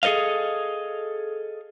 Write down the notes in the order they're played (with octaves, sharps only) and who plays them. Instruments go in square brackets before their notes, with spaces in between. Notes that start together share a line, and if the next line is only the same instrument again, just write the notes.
[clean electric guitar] G#4 A4 C5 D#5 F5